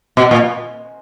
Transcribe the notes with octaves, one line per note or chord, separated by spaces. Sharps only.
B2
A#2